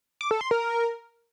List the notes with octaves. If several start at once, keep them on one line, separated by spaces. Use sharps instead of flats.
D6
A4
C6
A#4